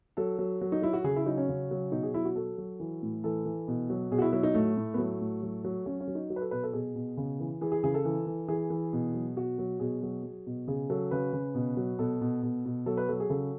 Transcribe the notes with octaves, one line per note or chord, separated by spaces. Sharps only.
F#3 A4
F#3
F#3
D#4
F#3 E4
F#4
C#3 G#4
E4
F#3 D#4
C#4
C#3
F#3
B2 D#4
G#4
F#3 E4
F#4
F#3 A4
F#3
E3
A2
E3 A4
E3
B2
F#3
B2 G#4
F#4
E4
F#3 E4
D#4
A2 A3
A2
B3
F#3 A3
A2
F#3
F#3
F#3 C#4
C#4
F#3
D#4
F#3 F#4
B4
A4
B2 B4
A4
B2 G#4
B2
C#3
E3
E3 G#4
G#4
C#3 G#4
A4
E3
E3
E3 G#4
E3
B2
F#3
B2 F#4
F#3
B2 G#4
F#3
F#3
B2
C#3 G#4
F#3 A4
C#3 B4
C#3
B2
F#3
B2 A4
B2
B2
B2
F#3 A4
B4
F#3 A4
G#4
C#3 A4